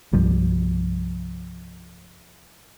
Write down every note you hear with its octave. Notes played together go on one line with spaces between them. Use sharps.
C2 G2 F3 G3